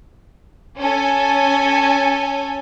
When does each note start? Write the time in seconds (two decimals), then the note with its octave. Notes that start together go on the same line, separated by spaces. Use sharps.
0.79 C#4 A4 G#5